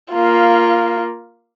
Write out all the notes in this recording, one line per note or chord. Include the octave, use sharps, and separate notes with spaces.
A#3 F4